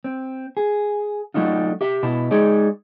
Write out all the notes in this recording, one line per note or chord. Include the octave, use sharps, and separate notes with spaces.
C4
G#4
F#3 A3 D4 D#4 F4
G4 E5
B2 E4 A5
G#3 D#4 G#4 D5